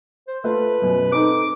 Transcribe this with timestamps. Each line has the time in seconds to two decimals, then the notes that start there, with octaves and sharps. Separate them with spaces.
0.27 C5
0.44 A3 F4 B4
0.82 F#2 B2
1.12 C4 D#4 A4 D6